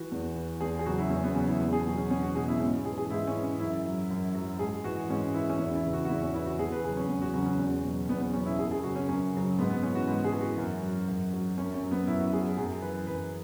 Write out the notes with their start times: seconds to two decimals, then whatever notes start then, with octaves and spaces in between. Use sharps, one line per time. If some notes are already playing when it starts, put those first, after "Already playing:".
Already playing: E3 F#4
0.12 E2
0.36 E3
0.61 E2 G#4
0.79 G#4
0.86 C#3 F#3 F#4
0.98 E4
1.10 E2 C#4
1.23 B3
1.36 C#3 F#3 C#4
1.48 E4
1.61 E2 G#4
1.73 G#4
1.85 B2 F#3 F#4
1.98 C#4
2.10 E2 C#4
2.23 F#4
2.35 B2 F#3 G#4
2.48 E4
2.60 G#2 C#4
2.85 E3 G#4
2.98 G#4
3.10 G#2 E4
3.27 C#4
3.35 E3
3.44 C#4
3.60 F#2 E4
3.85 F#3
4.10 F#2
4.35 F#3
4.59 G#2 G#4
4.84 E3 F#4
5.10 G#2 C#4
5.34 E3 E4
5.49 C#4
5.59 E2 E4
5.76 E4
5.84 C#3 E3
5.93 F#4
6.05 F#4
6.09 E2 E4
6.21 C#4
6.34 C#3 E3 E4
6.46 F#4
6.59 E2 G#4
6.72 B4
6.84 C#3 F#3 G#4
6.97 C#4
7.09 E2
7.22 F#4
7.34 C#3 F#3 C#4
7.46 C#4
7.59 E2
7.84 B2 F#3
8.09 E2 B3
8.21 B3
8.33 B2 F#3 C#4
8.46 E4
8.58 F#2 G#4
8.71 G#4
8.83 C#3 F#3 F#4
8.96 C#4
9.08 F#2 C#4
9.33 C#3 F#3
9.58 G#2 B3
9.70 B3
9.83 E3 C#4
9.95 F#4
10.08 G#2 B4
10.24 G#4
10.33 E3
10.41 F#4
10.58 F#2
10.83 F#3
11.08 F#2
11.33 F#3
11.58 F#2 C#4
11.74 C#4
11.83 F#3
11.91 B3
12.07 F#2 E4
12.20 F#4
12.32 F#3 G#4
12.45 G#4
12.57 F#2 G#4
12.82 E3 B4
13.07 F#2 B4